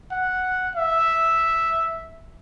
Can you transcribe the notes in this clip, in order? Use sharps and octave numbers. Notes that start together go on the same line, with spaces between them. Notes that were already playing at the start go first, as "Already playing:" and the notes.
F#5
E5